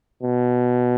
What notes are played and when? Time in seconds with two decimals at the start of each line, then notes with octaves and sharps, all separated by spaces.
0.23 B2